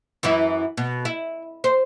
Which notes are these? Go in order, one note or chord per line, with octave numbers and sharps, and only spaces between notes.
F#2 E3 E4
B2
E4
C5